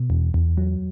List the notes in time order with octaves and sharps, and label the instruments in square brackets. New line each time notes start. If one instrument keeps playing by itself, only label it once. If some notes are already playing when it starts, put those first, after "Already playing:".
Already playing: [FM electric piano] B2
E2
E2
F#3